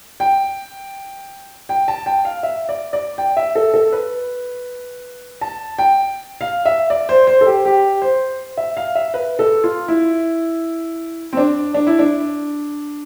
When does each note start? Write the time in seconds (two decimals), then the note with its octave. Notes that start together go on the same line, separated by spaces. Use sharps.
0.20 G5
1.69 G5
1.88 A5
2.06 G5
2.25 F5
2.43 E5
2.69 D5
2.93 D5
3.18 G5
3.37 E5
3.55 A4
3.74 A4
3.93 B4
5.41 A5
5.79 G5
6.41 F5
6.66 E5
6.90 D5
7.09 C5
7.27 C5
7.41 A4
7.46 G4
7.65 G4
8.02 C5
8.57 E5
8.77 F5
8.95 E5
9.14 B4
9.39 A4
9.64 F4
9.88 E4
11.33 C4
11.37 D4
11.74 D4
11.87 E4
11.99 D4